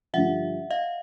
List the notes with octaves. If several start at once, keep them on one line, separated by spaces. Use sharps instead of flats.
G2 D3 F3 E5 F#5
D#5 F5